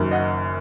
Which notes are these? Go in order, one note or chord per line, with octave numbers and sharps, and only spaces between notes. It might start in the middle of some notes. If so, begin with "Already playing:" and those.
Already playing: F#1 F#2 D#3
D#5 F#5